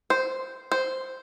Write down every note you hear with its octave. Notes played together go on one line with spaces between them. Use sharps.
C5
C5